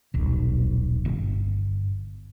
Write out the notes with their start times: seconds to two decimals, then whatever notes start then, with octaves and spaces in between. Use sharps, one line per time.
0.14 D#1 B1
1.05 G1